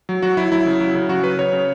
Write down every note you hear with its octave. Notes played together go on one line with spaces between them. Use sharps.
F#3
F#3 F#4
F#3 E4
F#3 E4
C#3
F#3
C#3
F#3 F#4
F#3 B4
C#3 C#5
C#3